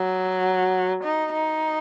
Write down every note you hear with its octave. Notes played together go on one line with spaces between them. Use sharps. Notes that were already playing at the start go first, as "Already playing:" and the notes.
Already playing: F#3
D#4
D#4